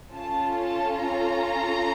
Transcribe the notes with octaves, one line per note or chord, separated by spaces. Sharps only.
C#4 F4 A4 A5
A5
A#5